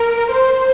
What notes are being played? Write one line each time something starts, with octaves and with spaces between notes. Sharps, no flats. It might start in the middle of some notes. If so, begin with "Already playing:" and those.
Already playing: A#4
C5